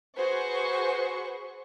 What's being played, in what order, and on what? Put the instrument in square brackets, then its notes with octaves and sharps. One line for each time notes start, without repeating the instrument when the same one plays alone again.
[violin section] F#4 G#4 B4 C5 C#6